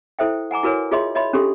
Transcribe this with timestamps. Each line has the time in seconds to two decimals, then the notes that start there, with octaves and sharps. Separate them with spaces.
0.19 E4 A4 C5 E5 G5
0.51 F#5 G#5 A#5 D6
0.63 E4 F#4 A#4 B4 C#5 G#5
0.91 F4 G#4 C#5 D#5 E5 C6
1.15 C#5 D#5 E5 B5 C6
1.33 C#4 D4 G4 A4 C6